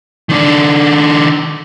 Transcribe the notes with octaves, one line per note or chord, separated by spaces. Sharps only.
D#3 D4